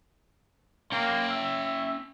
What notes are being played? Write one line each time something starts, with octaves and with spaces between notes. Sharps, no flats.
A#3 C#4 G5
E5